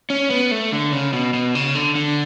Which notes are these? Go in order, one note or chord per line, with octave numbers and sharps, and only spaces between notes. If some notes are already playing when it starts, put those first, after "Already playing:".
C#4
B3
A3
D3
C#3
B2
B2
C#3
D3
D3